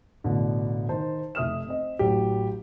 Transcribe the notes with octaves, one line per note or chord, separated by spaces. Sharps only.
A1 B2 D3
D#3 C5 A5
F1 E5 D#6 F6 E7
C4 D#5
A1 F#3 G4